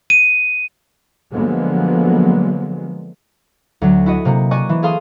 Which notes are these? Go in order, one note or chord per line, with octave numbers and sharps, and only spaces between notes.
D#7
D3 F3 F#3 G#3 A#3 B3
D2 F#3
E4 F#4 D#5
C3 A#3 F#4
D5 D#5 G#5 C#6 D6 F#6
E3
G#4 A4 F5 C6 D#6